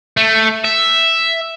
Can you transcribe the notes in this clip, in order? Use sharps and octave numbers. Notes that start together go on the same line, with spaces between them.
A3
E5